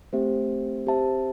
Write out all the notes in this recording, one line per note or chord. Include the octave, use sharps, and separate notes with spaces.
A3 C4 G4 C5 E5
C4 G4 C5 E5 A5